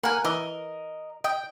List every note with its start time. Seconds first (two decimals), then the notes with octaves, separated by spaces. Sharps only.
0.03 A#3 A#4 F#5 G#5
0.25 E3 A#4 D#5
1.24 D#5 G5